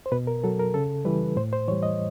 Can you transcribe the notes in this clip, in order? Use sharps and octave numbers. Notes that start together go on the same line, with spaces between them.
C5
B2 B4
A#4
F#3 A4
A#4
C#3 A4
E3 G3 B4
A2 C5
C5
E3 G3 C#5
D#5